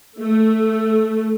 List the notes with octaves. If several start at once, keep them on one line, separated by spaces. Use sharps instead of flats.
A3